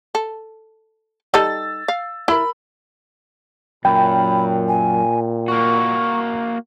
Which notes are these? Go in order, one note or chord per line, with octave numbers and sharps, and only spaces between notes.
A4
G3 D#4 A4 E6 A6
F5
E4 A#4 B5 E6
F#2 A#2 G5 B5
G#5
A#3 F#4 C#6